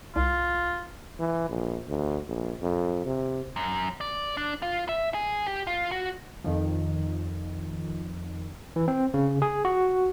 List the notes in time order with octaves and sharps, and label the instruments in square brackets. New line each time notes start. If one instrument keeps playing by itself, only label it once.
[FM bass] C2 [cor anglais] F4
[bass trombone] E3
A#1
D2
A#1
F2
C3
[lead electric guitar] F#2
D5
D4
F4
E5
G#4
G4
F4
F#4
[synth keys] F2 D#3 F3
[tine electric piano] E3
C4
C#3
G#4
F#4